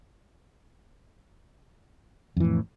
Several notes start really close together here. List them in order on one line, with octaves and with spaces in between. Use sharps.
F2 E3 A2